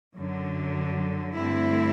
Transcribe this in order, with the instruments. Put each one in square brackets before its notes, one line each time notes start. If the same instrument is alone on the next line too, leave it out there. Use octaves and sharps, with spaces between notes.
[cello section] F#2 D3 F#3
G2 D3 A3 C4 E4